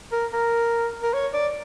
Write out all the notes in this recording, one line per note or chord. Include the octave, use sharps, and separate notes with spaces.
A#4
A#4
A#4
C#5
D5